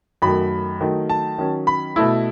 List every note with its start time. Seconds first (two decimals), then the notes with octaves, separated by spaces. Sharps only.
0.22 F#2 D#3 F#3 A3 B5
0.81 D#3 F#3 A3 D#4
1.09 A5
1.38 D#3 F#3 C#4
1.67 B5
1.96 B2 A3 E4